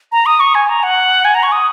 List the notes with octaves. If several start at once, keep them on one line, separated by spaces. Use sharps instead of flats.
A#5
D#6
C#6
G#5
A#5
F#5
G#5
A#5
C#6
D#6